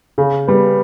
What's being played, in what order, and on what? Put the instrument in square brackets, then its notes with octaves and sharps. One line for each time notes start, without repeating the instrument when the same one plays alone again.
[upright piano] C#3
G3 B3